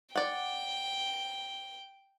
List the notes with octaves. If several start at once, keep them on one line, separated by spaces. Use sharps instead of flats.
D5 F#5 G5